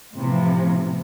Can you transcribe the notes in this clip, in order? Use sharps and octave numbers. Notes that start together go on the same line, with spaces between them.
A2 C3 E3 F3